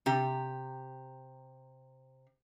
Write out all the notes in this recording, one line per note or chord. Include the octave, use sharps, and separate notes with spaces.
C3 G4